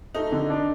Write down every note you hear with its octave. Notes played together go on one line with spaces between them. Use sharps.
A3 D#4
D3
D4